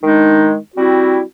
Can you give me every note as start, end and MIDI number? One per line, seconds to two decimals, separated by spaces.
0.03 0.56 51
0.03 0.56 56
0.03 0.56 62
0.03 0.56 63
0.76 1.21 55
0.76 1.21 60
0.76 1.21 64
0.76 1.21 66